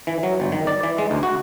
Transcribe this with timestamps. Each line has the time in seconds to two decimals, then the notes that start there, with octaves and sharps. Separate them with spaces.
0.07 E3
0.23 F#3
0.40 G1
0.52 D#3
0.67 D5
0.83 E3
0.98 G#3
1.11 D2
1.23 F#4